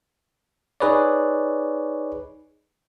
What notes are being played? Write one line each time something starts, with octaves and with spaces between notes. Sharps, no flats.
D#4 G#4 B4 C#5 D5